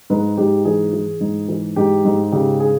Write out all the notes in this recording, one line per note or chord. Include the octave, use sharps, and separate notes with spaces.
G#2 B4
G#2 G4
E3 G#4
E3
G#2
E3
G#2 G4
G#2
C#3 G4
G#4